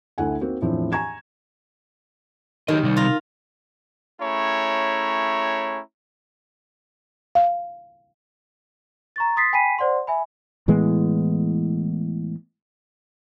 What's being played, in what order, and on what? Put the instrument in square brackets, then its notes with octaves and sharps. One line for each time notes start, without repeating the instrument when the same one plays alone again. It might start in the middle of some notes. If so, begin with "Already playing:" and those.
[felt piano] D2 A3 E4 F#5 G#5
A#3 C4 D#4 F#4
E2 A2 F3 C4 D4
G#5 A#5 C#6 G#6 E7
[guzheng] D#3 [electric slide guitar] F#3 G4 D#5
[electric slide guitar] C3 G3
[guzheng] F4 A#5
[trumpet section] A3 C#4 E4 G#4 C#5 A#5
[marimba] F5
[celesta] A#5 C#6 A6
C6 D#6 A6 B6 C7
G5 G#5 B5 B6 C7 D#7
C5 D5 F#5 C6
E5 G#5 B5
[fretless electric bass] A2 E3 G#3 B3